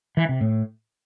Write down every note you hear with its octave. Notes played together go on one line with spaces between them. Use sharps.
E3
C3
A2